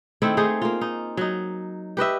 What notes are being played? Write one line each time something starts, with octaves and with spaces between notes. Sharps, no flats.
D#3 A3 C4 E4
A3 D#4 G#4 C5
A#3 F4
D#4
F#3 D#4
G4 B4 D#5 E5